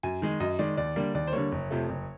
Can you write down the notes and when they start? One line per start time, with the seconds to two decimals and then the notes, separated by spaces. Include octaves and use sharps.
0.03 F#2 G#5
0.22 D#3 G#3
0.40 F#2 D#5
0.59 D#3 G#3 D5
0.77 D#2 D5
0.96 D3 G3 A#3
1.15 D#2 D5
1.27 C5
1.33 D3 G3 A#3 C#5
1.52 F#1
1.70 F2 C3 F3 A3
1.89 F#1